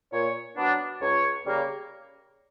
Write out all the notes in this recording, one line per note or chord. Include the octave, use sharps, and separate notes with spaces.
A#2 C#5
F#3 B3 D4
C#2 C#5
C#3 G3 A#3